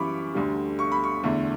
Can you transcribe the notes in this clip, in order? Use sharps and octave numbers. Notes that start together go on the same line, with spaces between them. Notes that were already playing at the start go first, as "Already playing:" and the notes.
Already playing: F#2 E3 G3 B5 C#6 D6
D2 D3 G3
C#6
B5
C#6
E2 D3 A3